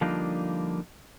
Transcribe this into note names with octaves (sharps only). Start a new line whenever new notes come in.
D3 F3 G3 A#3 D4 D#4